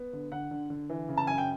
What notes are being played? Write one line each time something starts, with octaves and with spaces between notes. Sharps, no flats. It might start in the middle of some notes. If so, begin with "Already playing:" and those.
Already playing: B3
D3
D3 F#5
D3
D3
E3
C#3
A5
F#2 G#5
G5